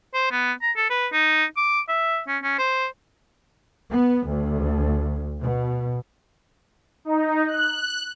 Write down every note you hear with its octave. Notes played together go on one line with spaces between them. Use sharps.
C5
B3
A#5
A4
B4
D#4
D6
E5
C#4
C#4
C5
B3
D2
B2
D#4
F#6